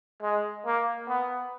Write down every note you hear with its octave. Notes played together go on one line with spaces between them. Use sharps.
G#3
A#3
B3